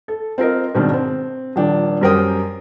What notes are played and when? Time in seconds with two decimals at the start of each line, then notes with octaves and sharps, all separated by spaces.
0.08 A4
0.38 C4 F4 A#4 D#5
0.74 G#2 B2 D#3 C4 D4
0.93 C4
1.56 D#1 F3 D4 G5
2.01 F#2 G3 A#4 C5 G5 D#6